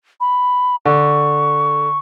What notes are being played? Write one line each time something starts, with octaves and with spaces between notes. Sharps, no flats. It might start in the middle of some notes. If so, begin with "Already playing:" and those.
B5
D3 C#6